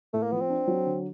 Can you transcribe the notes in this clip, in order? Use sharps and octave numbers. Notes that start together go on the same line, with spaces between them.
A2 A3
A#3
F3 B3
C4
D4
F#3
D3